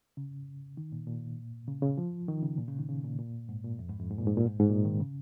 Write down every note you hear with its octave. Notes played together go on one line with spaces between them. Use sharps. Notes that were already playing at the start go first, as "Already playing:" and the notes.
C#3
D#3
A#2
A#2
C#3
C#3
F3
D#3
C#3
A#2
C#3
D#3
C#3
A#2
A#2
G#2
A#2
F2
G#2
F2
G#2
A#2
G#2
A#2
G#2
G#2
A#2
D#3
C#3